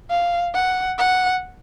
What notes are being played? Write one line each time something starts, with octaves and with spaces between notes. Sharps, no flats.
F5
F#5
F#5